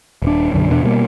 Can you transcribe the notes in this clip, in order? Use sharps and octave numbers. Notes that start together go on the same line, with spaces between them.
D#1 D4
B1 F#2 D3
E2 B2 D4
B2 G3 A3 A#3